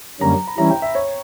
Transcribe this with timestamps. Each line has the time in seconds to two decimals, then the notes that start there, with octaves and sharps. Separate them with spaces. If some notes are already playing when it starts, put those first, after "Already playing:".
0.20 F#2 D3 G3 A#3 C#4 A#5
0.47 B5
0.58 E3 G3 C#4 E4 A#5
0.70 G5
0.82 E5
0.95 C#5